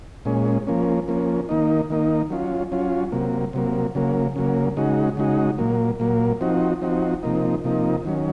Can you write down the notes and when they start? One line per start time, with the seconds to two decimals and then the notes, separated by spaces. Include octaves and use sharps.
0.25 A#2 G#3 C#4
0.67 F3 A#3 C#4
1.08 F3 A#3 C#4
1.49 D#3 A#3 D#4
1.90 D#3 A#3 D#4
2.30 F#3 C#4 F4
2.72 F#3 C#4 F4
3.12 C3 F#3 A#3
3.53 C3 F#3 A#3
3.95 C#3 F#3 A#3
4.36 C#3 F#3 A#3
4.77 C#3 G#3 D#4 F#4
5.17 C#3 G#3 D#4 F#4
5.58 A#2 F#3 A#3
6.00 A#2 F#3 A#3
6.41 F3 C4 D#4 F#4
6.81 F3 C4 D#4 F#4
7.23 C3 F3 A#3 D#4
7.64 C3 F3 A#3 D#4
8.05 D#3 F#3 C#4